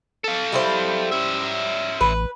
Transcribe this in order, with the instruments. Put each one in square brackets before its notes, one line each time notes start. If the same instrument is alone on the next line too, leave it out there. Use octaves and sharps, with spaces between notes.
[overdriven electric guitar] A4 F5
[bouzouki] G3 E4 C5
[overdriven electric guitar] C#4 E5
[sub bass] A1 [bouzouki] B4